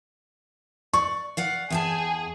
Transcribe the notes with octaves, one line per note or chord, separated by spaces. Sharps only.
D5 C#6
D5 F5 F#5
E2 G#4 G5 A5